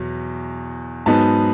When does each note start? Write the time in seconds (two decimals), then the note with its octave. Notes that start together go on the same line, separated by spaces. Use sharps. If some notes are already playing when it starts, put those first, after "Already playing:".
Already playing: E2 B2 F#3
1.06 G#2 F#3 B3 D#4 A5